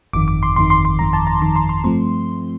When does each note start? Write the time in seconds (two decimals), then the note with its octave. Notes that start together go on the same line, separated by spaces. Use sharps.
0.13 G1 F2 D#3 D6
0.28 D6
0.43 C6
0.56 G1 F2 D#3 C6
0.70 C6
0.85 C6
0.99 G1 F2 D#3 A#5
1.13 A5
1.27 A#5
1.42 G1 F2 D#3 C6
1.56 C6
1.69 C6
1.84 G2 F3 A3 C4 C6